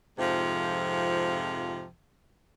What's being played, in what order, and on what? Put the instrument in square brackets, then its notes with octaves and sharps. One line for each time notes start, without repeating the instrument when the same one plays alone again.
[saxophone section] F2 G#2 C3 F3